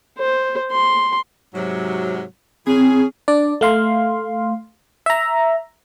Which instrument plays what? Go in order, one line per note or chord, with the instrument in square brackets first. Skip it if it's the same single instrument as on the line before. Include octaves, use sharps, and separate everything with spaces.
[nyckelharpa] C5
C6
[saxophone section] G#2 C3 F#3
[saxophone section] E3 C#4 G#4 [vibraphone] C4
[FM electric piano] D4 D5
A3 F5 C6
E5 A#5